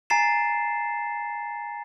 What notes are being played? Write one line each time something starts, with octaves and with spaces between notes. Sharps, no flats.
G#5 A#5 A6 C7 E7